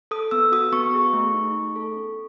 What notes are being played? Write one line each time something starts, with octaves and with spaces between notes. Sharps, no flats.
A4 D#6
B3 E6
F#4 D#6
B3 C#6
G#4
A3
D#4
A3
A4
C#4